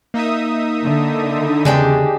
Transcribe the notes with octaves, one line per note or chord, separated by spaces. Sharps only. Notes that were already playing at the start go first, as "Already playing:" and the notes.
A#3 D#4 E5 D#6
D3
E2 C#3 G#3 D4 G4